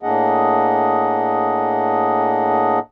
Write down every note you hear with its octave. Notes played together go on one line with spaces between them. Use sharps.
A2 A#3 D4 G#4 D#5 F#5